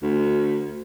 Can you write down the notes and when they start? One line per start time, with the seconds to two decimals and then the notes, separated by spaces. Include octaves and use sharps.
0.03 D2